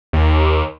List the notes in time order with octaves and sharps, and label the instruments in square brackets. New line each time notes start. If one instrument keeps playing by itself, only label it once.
[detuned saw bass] D#2